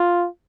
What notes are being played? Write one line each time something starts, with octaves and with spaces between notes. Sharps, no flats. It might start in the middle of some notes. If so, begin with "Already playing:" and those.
Already playing: F4